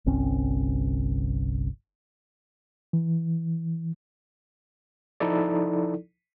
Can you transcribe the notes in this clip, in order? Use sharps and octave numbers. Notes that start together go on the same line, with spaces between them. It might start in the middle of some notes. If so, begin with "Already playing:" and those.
G1 C2 C4 C#4
E3
F3 D#4 E4 A4 D5